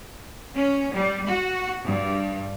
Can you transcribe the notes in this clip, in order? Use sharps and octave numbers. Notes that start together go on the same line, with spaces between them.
C#4
G3
F#4
G2